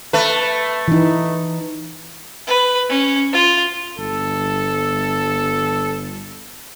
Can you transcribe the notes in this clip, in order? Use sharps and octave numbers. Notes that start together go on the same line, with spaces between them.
A3 B4
E3 D#4
B4
C#4
F4
G1 A4